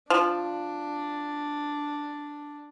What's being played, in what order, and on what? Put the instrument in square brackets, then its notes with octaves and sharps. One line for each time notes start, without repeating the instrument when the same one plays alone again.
[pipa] F3 [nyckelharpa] D4